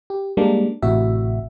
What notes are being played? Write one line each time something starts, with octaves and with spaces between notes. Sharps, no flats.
G4
G3 G#3 A#3 D4
A1 A2 C3 F#4 E5